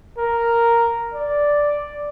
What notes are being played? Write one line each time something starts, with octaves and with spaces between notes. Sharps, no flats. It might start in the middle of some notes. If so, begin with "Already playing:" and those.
A#4
D5